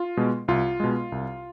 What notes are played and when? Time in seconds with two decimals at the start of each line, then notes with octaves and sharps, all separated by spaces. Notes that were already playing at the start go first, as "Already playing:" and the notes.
Already playing: F4
0.17 B2 G#3
0.48 C2 F4
0.80 B2 G#3
1.12 C2